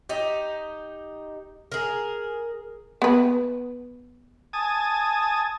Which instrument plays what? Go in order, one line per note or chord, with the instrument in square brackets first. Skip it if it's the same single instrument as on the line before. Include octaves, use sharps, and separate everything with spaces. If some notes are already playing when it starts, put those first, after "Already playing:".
[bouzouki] D#4 G4
G#4 A#4
[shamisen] B3 B4
[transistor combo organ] G#5 A5 D#6